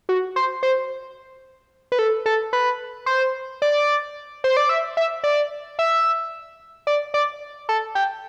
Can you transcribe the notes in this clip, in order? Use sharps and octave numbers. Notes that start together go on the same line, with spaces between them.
F#4
C5
C5
B4
A4
A4
B4
C5
D5
C5
D5
E5
E5
D5
E5
D5
D5
A4
G4